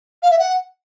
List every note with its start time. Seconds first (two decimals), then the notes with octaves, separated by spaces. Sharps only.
0.22 F5
0.30 E5
0.38 F#5